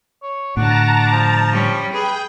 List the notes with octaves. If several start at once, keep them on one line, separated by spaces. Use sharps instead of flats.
C#5
A2 D3 D4 F#4 A5 A#5
F3
G3 C#4
G#4 B4 G5 G6